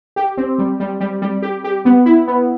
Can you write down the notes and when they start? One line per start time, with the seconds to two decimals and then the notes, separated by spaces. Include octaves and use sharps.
0.16 G4
0.37 C4
0.58 G3
0.80 G3
1.00 G3
1.22 G3
1.42 G4
1.64 G4
1.85 B3
2.06 E4
2.27 B3